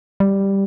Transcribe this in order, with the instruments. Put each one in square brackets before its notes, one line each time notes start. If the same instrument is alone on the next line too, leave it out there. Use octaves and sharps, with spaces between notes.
[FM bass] G3